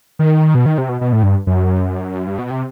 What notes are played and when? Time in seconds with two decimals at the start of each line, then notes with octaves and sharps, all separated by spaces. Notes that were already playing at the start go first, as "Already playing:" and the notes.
0.19 D#3
0.55 B2
0.66 D#3
0.78 C3
0.89 B2
1.01 B2
1.13 A2
1.23 G2
1.47 F#2
2.27 G2
2.39 B2
2.50 C3